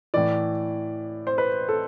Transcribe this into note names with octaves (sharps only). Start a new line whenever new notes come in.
A2 E3 D5
C5
B4
A4